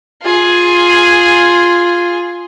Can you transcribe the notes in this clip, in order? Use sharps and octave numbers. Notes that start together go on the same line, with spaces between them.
F4 G#4